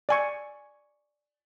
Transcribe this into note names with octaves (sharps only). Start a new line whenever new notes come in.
D5 G#5 C#6